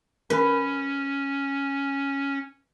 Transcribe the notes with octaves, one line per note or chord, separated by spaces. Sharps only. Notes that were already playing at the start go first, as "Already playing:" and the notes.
C#4 B4